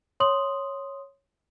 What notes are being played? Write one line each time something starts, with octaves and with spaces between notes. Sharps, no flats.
C#5 C6 D#6 F#7